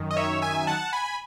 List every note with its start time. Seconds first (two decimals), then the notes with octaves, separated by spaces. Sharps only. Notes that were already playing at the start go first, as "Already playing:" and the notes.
Already playing: F#2 D#3
0.11 D#5
0.17 C#5 E5
0.42 E5 G#5
0.67 F#5 A5
0.93 G#5 B5